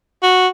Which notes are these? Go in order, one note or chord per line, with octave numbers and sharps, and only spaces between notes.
F#4